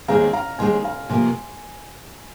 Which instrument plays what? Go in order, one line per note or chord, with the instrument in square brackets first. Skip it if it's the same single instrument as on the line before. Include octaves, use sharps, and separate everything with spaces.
[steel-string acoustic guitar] D#2 D#3 G#3 C4 G#4 [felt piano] F5 A#5
[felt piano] F5 A#5
[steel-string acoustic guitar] D#2 D#3 G#3 C4 G#4 [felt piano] G#5 C6
[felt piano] F5 A#5
[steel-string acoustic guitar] C3 F3 A#3 [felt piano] G#5 C6